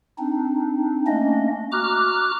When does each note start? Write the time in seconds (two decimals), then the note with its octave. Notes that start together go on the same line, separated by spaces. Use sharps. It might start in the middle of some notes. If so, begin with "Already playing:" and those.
0.19 C4 D4 D#4
1.07 A3 A#3 C#4 D4 D#5
1.72 F#4 A#5 D6 F6 F#6